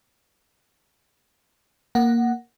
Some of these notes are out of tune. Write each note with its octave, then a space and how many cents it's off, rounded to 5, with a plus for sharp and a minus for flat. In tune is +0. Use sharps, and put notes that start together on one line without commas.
A#3 +0 F#5 +0